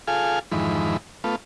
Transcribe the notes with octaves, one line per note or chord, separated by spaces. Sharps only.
F4 G#4 A4 F5 G#5
F2 G#2 D#3 E3 B5
A3 B3 F4